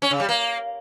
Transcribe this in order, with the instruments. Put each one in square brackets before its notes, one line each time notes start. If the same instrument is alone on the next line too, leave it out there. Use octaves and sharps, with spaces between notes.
[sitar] C#4
C#3
G3
A#3